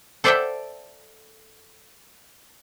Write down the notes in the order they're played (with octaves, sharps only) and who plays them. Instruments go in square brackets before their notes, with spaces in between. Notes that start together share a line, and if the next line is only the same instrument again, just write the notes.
[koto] A4 C5 D5 E5 F#5 G5